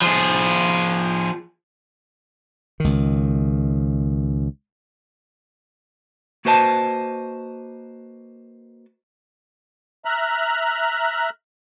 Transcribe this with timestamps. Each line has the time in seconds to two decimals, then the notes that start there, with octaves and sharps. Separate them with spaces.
0.02 F3 G#4
2.80 C#2 D#3
6.45 A#3 F#4 B4 C5 D#5 A5
10.05 E5 A#5 F6 F#6